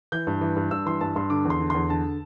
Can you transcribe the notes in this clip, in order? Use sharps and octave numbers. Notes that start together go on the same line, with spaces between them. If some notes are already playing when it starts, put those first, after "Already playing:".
E3 G6
G2
E3
G2
G2 E6
E3 C6
G2 A5
G2 C6
D3 D6
E2
C6
D3
E2 C6
D3 A5